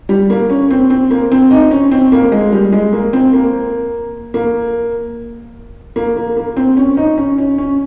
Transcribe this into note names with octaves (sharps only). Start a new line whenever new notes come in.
G3
A#3
C#4
C4
C4
A#3
C4
D#4
C#4
C4
A#3
G#3
G3
G#3
A#3
C4
A#3
A#3
A#3
A#3
A#3
C4
C#4
D#4
C#4
C#4
C#4